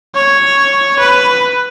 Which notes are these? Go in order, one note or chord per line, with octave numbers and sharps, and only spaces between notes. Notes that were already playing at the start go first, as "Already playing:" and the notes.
C#5
B4